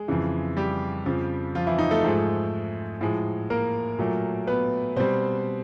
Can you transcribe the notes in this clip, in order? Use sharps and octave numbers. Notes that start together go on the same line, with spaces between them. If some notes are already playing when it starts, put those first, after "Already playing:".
Already playing: G#3 G#4
F2 C#3 E3
G3 G4
F2 C#3 F3
F3 F4
E3 E4
D#4
A3 A4
G#2 F3 G#3
A2 F3 G#3
A#3 A#4
A#2 F#3 A3
B3 B4
B2 G3 C4 C5